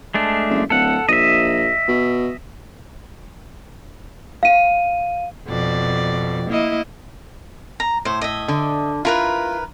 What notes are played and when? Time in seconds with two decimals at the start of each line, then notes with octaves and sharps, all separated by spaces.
0.14 G#3 A3 D4
0.50 F#1
0.70 D1 A4 F#5
1.09 A#1 D#5 E5
1.88 B2
4.43 F5 D#7
5.47 F2 B2 D5
6.49 A#3 E4 D#5
7.80 A#5
8.05 A2 C5
8.21 D#5 E5
8.48 D3
9.05 E4 F4 A#4 B4